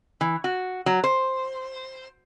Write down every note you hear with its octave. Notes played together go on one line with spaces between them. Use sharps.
E3
F#4
F#3
C5